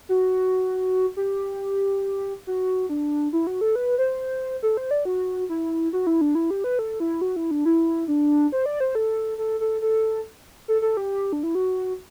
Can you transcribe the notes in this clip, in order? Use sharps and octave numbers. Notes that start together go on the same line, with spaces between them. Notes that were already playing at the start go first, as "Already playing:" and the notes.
F#4
G4
F#4
D4
E4
F#4
A4
B4
C5
A4
C5
D5
F#4
E4
F#4
E4
D4
E4
G4
B4
A4
E4
F#4
E4
D4
E4
D4
C5
D5
C5
A4
A4
A4
A4
A4
A4
G4
D4
E4
F#4